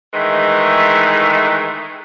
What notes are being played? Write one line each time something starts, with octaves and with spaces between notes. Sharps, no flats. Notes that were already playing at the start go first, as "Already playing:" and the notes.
D#3 E3 G#3 A3